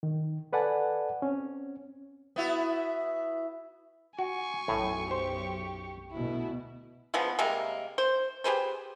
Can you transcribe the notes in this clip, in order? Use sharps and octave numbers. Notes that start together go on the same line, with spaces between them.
D#3
A4 B4 D5 F#5 G#5 A5
C4 C#4
B3 E4 F#4
F#4 G#5 C#6
B1 F#2 A2
G4 C5
D2 B2 E4
C#3 F3 G#3 B3
C3 G3 G#3 A#3
C5
G4 G#4 B4 C5